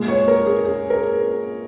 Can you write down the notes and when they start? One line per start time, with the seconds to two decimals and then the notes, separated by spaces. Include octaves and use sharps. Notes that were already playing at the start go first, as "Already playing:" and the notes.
Already playing: A#2 G#3
0.08 C#5
0.28 A#4
0.46 G#4
0.65 G#4
0.90 A#4